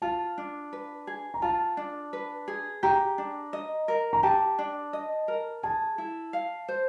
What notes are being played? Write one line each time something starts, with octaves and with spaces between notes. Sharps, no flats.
F4 A5
D4
B4
G#4
A#5
F4 A5
D4
B4
G#4
G4 A#5
D4
D#5
A#4
A#5
G4 A5
D4
D#5
A#4
G#4 A5
E4
F5
C5